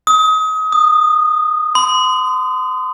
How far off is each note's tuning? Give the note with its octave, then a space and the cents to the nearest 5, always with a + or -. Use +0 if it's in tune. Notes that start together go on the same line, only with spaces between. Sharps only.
D#6 +30
D#6 -20
C6 -35